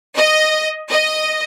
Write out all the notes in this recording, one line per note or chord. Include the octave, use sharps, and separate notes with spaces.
D#5
D#5